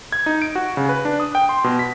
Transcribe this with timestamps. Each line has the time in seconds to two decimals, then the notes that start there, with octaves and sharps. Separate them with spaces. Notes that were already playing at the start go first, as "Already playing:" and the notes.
0.12 G#6
0.26 D#4
0.42 D7
0.55 F#4
0.77 C#3
0.89 B4
1.05 D4
1.20 D#6
1.35 G5
1.49 C6
1.64 B2
1.79 B6